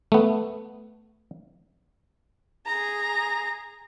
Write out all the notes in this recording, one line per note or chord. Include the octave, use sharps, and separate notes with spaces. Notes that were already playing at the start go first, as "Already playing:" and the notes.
A3 B3
G#4 A#5